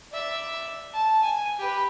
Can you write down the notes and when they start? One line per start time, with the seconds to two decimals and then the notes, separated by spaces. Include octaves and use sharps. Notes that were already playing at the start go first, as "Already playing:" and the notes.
0.12 D5 E5
0.94 A5
1.23 G#5
1.59 G4 B4